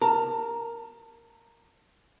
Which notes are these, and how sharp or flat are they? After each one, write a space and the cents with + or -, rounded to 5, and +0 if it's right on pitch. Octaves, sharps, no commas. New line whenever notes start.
A#4 +0 A5 +30